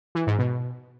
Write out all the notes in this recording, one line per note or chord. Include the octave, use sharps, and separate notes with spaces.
E3
G#2
B2